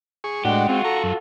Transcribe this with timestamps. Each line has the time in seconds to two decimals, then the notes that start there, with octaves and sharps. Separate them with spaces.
0.24 G#4 C#6
0.45 A2 G#3 D4 F#4 G4 F#5
0.69 G#3 C4 F4 F#4
0.84 A4 A#5 C#6
1.03 F#2